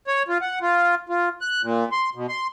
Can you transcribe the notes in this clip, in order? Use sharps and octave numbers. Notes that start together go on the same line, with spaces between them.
C#5
F4
F#5
F4
F4
F#6
A#2
C6
B2
C6